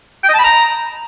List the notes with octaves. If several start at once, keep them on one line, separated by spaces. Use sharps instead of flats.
G5
D#5
A5
B5
A#5